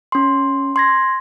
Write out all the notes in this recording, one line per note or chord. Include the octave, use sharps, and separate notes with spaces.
C#4 C6
C6 G#6 A#6